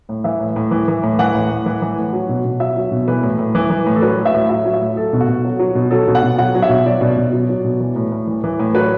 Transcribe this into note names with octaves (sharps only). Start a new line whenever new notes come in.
A2
E3 E5
A2
A2
E3
E3
A2
E3 F#5
A2
A2
E3
E3
A2
F#3
B2
B2
F#3 E5
F#3
B2
E3 B4
A2
A2
E3
E3
A2
A4
F#3 B4
A2
E5
A2
F#3 E5
F#3
E5
A2
F#3 A4
B2
F#4
B2
F#3
F#3
B2
F#3 A4
B2
F#5
B2
F#3 F#5
F#3
E5
B2
F#3 D5
B2
B2
F#3
F#3
B2
E3
A2
A2
E3
E3
A2
F#3 B4